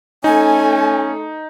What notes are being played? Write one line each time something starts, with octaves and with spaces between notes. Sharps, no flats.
A3 C#4 D#4 A4 G#5